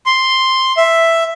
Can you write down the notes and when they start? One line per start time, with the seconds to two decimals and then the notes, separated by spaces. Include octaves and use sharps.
0.06 C6
0.77 E5